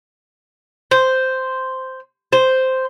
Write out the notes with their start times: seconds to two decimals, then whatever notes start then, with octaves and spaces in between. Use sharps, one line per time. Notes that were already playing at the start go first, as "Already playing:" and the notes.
0.91 C5
2.33 C5